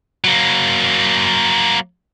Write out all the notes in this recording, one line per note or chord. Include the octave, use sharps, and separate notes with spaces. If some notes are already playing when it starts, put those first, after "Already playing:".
F#3 A#3